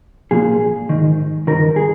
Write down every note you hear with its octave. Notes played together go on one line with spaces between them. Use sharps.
A#2 F3 G#4
G#2 D#3
G2 D#3 A#4
G#4